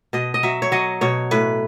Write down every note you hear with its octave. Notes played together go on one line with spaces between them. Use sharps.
B2 D#5
D#5
F#3 E5
C#5
F#3 D#5
B2 C#5
A2 B4